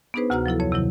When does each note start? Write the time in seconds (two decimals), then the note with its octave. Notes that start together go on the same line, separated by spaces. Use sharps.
0.14 B3 D4 D#4 G#4 B4 C5
0.30 D2 C3 F#4 F#5 A#5 F6
0.46 F3 F#3 E4 A4
0.60 F2 C#5
0.72 C3 D#3 F#3 E4